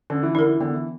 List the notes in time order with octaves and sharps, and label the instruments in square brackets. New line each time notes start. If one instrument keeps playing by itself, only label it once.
[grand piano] D3 [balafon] C#4
[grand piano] E3
[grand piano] D3 [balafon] E4 A#4
[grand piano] E3
[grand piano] D3 [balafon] B3
[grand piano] E3